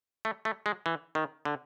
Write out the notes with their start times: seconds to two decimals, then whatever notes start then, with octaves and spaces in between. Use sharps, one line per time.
0.25 A3
0.45 A3
0.66 G#3
0.86 E3
1.15 D#3
1.45 D3